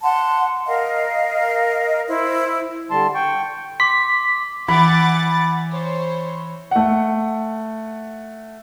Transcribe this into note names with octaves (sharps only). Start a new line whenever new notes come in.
F#5 A5 C6
A#4 D#5 F5
E4 C5
D3 G3 A5 C6
G5 C#6
C6 D6 B6
E3 F#5 B5 D6 A6
C5 C#5
A3 F#5